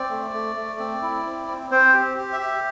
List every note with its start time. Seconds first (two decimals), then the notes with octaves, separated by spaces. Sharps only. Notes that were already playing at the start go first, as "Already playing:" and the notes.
Already playing: C4 D5
0.10 A3
0.33 A3
0.56 A3
0.79 C4
1.02 E4
1.25 C4
1.48 C4
1.71 C4 C5
1.94 G4
2.17 G4
2.33 E5
2.40 G4